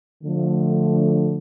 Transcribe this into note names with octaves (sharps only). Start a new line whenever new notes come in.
D3 F3 A3